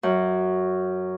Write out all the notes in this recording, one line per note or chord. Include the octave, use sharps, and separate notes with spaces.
F#2 F#5